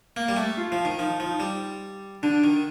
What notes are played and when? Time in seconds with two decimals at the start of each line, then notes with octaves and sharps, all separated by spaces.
0.17 A#3
0.29 G3
0.37 A3
0.58 F4
0.72 F3
0.85 D#3
0.99 F3 D#4
1.20 F3
1.40 G3
2.23 D3 D4
2.44 D#3